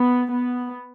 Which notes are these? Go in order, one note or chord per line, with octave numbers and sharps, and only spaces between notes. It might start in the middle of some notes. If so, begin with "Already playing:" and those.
Already playing: B3
B3